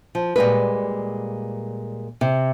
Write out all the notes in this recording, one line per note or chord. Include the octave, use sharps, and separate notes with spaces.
F3
A#2 G3 G#3 B4
C3